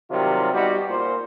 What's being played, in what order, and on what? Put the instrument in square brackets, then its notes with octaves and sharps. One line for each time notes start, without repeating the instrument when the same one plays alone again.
[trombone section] C3 D#3 F#3 G3 F4
G3 B3 D#4 F#4 G4
A#2 C5